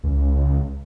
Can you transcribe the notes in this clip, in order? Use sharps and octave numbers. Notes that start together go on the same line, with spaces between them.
C#2